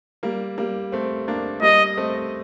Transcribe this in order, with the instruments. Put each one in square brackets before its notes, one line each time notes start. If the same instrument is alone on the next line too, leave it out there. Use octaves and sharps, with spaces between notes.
[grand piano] G3 A#3
G3 A#3
A3 C4
A#3 D4
[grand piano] G3 A#3 [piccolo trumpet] D#5
[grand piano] A3 C4